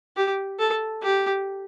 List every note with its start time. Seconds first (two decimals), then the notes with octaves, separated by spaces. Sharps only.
0.17 G4
0.60 A4
1.03 G4